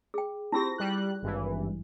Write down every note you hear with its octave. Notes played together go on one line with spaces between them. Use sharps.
G#4 G5
C4 E4 F4 G4 A#6
G3 F#6
G#1 G2 E3